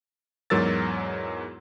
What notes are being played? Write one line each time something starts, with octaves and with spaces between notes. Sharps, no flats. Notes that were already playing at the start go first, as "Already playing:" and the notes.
E2 G#2 F#3 A#4 E6 A6